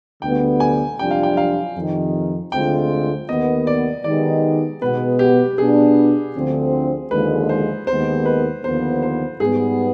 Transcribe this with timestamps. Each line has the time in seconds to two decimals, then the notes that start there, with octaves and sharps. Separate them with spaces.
0.22 D2 D3 G3 B3 G5
0.60 G#5
0.99 F2 C3 G3 D4 F4 G5
1.11 F5
1.23 G5
1.37 F5
1.76 F2 C3 D#3
2.51 D2 D3 G#3 C4 F4 G5
3.28 D#2 D#3 B3 D#5
3.67 D5
4.04 D#3 G#3 B3 D#4 G4 D5
4.82 B2 G#3 B3 B4
5.19 G4
5.58 B2 B3 D4 G#4
6.35 D2 D3 F3 C4
7.10 D#2 D3 F3 G#3 B4
7.49 C5
7.87 D#2 D#3 G#3 B3 C5
8.26 B4
8.63 D#2 D3 F3 B3 C5
9.02 C5
9.40 G#2 G3 B3 G#4